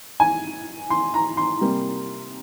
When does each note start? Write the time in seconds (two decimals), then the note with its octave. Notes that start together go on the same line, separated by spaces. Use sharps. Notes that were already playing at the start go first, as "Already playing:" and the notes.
0.20 G#5
0.90 C6
1.14 A#5
1.37 C6
1.61 C3 G3 A#3